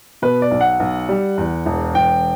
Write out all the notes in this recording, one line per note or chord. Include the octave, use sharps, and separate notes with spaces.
B2 B4
D5
B1
F#5
B1
G3
E2
E1
E1 G5